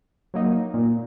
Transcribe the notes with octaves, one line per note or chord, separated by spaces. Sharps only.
F#3 A#3 D#4
A#2